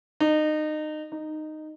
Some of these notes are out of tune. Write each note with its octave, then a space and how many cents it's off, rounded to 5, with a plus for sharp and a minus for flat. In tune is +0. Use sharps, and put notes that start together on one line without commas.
D#4 -25
D#4 -10